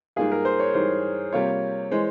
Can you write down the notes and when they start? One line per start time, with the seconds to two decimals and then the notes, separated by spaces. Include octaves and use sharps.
0.16 G#2 G3 A#3 F4 G#4
0.32 A#4
0.45 C5
0.60 C#5
0.74 G#2 E3 G3 C5
1.33 C3 G3 A#3 F4 C#5
1.91 E3 G#3 C5